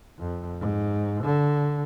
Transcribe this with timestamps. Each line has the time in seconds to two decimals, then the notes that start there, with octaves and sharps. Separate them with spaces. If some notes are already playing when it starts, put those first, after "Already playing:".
0.19 F2
0.60 G#2
1.24 D3